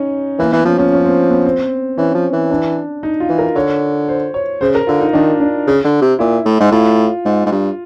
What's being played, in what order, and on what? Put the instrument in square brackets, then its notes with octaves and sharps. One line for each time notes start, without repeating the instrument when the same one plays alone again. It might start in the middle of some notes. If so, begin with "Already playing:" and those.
Already playing: [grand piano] C#4 D#4
[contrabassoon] E3 [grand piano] A#3
[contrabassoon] E3 [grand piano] B3
[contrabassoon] F3 [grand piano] C#4
[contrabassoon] F3 [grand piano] C#4
[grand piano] C#4
C4
B3
C4
[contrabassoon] E3 [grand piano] C#4
[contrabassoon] F3
E3
[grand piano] D4
D#4
F4
[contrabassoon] E3
[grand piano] A#4
[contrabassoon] D3 [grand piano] C#5
[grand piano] C5
C#5
[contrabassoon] C#3 [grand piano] C5
[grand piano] A#4
[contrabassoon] D3 [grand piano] F4
[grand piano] D#4
[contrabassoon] D#3 [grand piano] D4
[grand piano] D4
[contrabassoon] C#3
D3
C3
[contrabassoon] A#2 [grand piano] E4
[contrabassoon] A2
G#2
[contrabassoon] A2 [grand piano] F4
[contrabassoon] G#2
G#2
G2